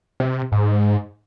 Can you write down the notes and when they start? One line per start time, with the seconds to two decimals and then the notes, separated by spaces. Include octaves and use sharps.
0.20 C3
0.52 G#2